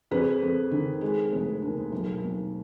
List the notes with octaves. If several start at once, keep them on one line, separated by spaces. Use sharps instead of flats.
F2 G#4 B4
F2
D#3
G#3
F1
D#2
B1
B1